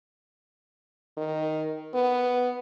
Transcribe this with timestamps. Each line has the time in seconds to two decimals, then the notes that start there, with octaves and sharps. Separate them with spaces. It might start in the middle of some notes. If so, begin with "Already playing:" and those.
1.17 D#3
1.95 B3